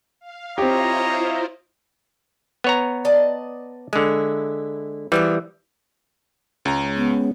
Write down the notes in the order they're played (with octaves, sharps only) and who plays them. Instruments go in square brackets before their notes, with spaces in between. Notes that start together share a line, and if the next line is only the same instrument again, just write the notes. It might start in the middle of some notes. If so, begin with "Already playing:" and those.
[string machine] F5
[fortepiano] C4 G4 [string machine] E4 F4 C5 [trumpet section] C#5 D#5 A#5
[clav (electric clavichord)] B3 C#5 A#5
[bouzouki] D5 D#5 A5
[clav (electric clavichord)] D3 G#3 [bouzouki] E4
[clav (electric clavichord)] E3 G3 [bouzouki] F3 B3 G#4
[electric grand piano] C#2 A#5 [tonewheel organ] G#3 C#4
[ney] B3